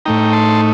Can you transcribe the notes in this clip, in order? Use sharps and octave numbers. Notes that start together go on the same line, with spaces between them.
A2 A3 D#4 G5 A#5
A5 C6